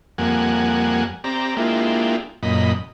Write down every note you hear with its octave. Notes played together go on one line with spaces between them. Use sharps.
F2 G3 A#3 F#5 G#5
C4 G4 D5 A#5
G#3 A#3 D4 E4 F4 G4
F#2 A#2 D#5 B5